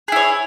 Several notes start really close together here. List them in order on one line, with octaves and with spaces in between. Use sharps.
G#4 E4 C#5